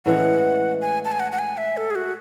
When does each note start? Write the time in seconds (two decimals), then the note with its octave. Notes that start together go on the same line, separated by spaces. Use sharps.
0.05 A2 E3 G#3 C#4 F#5
0.82 G#5
1.05 A5
1.12 G#5
1.20 F#5
1.32 F#5
1.39 G#5
1.57 E5
1.77 A4
1.91 G#4
1.95 F#4